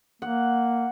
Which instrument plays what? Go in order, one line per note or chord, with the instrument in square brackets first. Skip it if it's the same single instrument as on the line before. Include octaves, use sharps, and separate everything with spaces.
[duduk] A#3 [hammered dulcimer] F#5